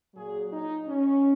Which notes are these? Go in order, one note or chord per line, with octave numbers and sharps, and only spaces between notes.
A#2 F#3 G#4
D#4
C#4